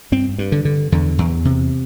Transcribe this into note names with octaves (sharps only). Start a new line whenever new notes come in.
G2 C4
G2
D3
D3
E2 D3
E2
C3